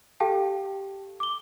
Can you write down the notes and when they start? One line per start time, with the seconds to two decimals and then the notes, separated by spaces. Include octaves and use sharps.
0.20 G4 A4 F5 G5 A5
1.20 D6 G7